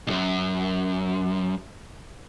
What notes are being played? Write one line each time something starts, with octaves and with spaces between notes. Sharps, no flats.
B1 F#2